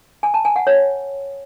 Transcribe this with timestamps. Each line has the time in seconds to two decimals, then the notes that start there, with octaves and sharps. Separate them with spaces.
0.23 G#5
0.34 A5
0.45 G#5
0.56 F#5
0.67 C#5